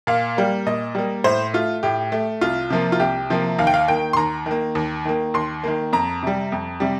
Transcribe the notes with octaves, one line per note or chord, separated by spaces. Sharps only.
A#2 F5
G3 A#3
A#2 D#5
G3 A#3
A2 C5
A3 F4
A2 G4
A3
C2 F4
C3 F3 A#3
F4
C2 G4
C3 F3 A#3
D#2 F5
G5
F5
D#3 A#3 G5
C6
D#2 A#5
D#3 A#3
D#2
D#3 A#3
D#2 C6
D#3 A#3
F2 A#5
C3 G3
F2
C3 G3